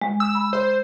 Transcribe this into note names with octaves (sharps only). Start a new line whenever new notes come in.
G#3
E6
B5
C5